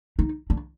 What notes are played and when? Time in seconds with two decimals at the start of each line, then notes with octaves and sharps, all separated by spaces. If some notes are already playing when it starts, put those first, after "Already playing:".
0.19 D#4
0.50 D4